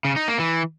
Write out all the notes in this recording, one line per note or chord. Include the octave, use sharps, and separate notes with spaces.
C#3
D#4
A#3
E3